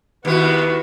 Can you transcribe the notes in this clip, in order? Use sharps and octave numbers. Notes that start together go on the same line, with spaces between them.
D#2 B3 E4 F#4 B4